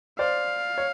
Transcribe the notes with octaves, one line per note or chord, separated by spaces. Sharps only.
C5 D5 F5
C#5